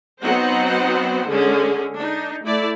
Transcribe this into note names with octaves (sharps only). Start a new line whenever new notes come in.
F#3 B3 C4 D#4 C5 F#5
D3 G#3 C#4 G#4
D4 D#4
A3 E4 D5